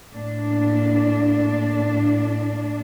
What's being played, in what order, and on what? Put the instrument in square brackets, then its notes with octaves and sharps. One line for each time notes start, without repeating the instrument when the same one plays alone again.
[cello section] A2 A#3 D4